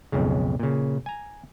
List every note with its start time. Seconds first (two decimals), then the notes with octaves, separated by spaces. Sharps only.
0.12 B1 F2 G#2 C#3
0.60 A#2 C#3
1.06 G#5 A#5